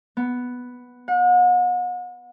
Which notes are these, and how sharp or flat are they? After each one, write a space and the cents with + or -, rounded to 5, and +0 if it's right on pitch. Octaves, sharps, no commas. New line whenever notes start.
B3 +0
F#5 -40